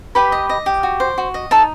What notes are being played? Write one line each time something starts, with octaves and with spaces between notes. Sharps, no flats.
G4 B4 B5
D#5
D#5
G4
F#4
C5
F#4
D#5
D#4 A4 A5